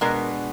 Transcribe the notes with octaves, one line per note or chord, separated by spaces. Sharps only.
B2 G#3 B3 D4 A#4